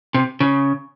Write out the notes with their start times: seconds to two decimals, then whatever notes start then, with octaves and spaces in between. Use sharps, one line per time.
0.14 C3
0.40 C#3